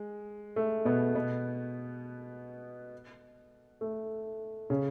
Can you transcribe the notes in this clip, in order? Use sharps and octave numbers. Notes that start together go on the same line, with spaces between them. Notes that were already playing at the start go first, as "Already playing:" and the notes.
Already playing: G#3
A3
B2 B3
B2 B3
A3
C#3 C#4